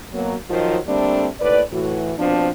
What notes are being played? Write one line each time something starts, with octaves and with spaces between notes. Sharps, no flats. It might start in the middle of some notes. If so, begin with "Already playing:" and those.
B2 F#3 A#3
D#3 F3 F#3 F4 C5 D#5
D3 G3 A3 A#3 C4 D4
D#2 A2 B4 D5
A2 E3 F#4
B2 F3 C4 D4